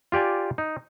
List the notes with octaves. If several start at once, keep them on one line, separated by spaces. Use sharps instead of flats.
F4 G4 D5 G#5
D#4